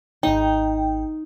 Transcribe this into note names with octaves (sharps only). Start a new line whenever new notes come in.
G#1 D#4 G5